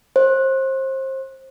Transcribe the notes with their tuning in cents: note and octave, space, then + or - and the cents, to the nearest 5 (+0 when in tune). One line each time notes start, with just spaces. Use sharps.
C5 +30